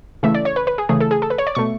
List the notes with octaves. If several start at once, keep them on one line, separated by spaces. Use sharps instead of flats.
C#3 E3 A3 E5
D5
C#5
B4
B4
G#4
C#3 E3 A3 G#4
A4
G#4
A4
B4
C#5
D5
B2 A3 C#6